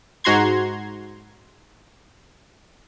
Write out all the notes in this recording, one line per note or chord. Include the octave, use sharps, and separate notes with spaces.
G#2 F#4 A#5 C6 G#6